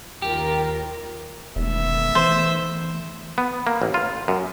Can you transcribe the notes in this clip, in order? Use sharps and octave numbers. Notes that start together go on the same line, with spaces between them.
D#2 F4 G4 A#4
E1 D#3 A3 B3 E5
E3 C5
B3
A#3
A1
F4
F#2